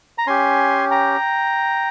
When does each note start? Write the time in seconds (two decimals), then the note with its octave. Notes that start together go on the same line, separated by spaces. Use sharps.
0.18 A#5
0.27 C#4 G4 G#5 C6
0.91 G5 A#5